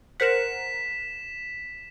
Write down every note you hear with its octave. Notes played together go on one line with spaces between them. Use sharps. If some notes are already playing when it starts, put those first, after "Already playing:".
A#4 C5 F#5 B6 E7